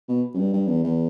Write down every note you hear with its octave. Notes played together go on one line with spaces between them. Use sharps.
B2
F#2
G2
G2
E2
E2